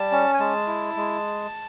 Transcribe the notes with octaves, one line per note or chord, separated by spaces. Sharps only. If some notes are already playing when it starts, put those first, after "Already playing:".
Already playing: G3 A5
C#4
G#5
G#3 A5
E4
G#3